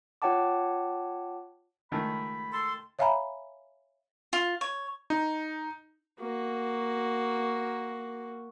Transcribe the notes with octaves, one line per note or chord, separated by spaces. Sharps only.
F4 C#5 F#5 G5 A5 D6
C#2 D#3 A3 B5
A4 C6
C#5 E5 F5 G#5 A#5 B5
F4
C#5
D#4
A#3 F#4